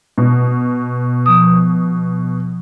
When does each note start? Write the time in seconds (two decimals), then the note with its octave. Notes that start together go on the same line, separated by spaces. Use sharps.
0.18 B2
1.26 F3 D#6